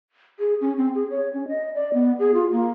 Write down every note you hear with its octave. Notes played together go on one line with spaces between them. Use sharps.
G#4
C#4
C4
G#4
C#5
C#4
D#5
D5
B3
G#4
F4
A#3